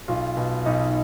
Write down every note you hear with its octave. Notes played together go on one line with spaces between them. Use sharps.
B1 F4
B2
B1 D#4